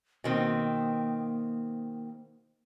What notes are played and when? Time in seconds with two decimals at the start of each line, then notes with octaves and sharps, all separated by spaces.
0.24 B2 D#3 A#3 C4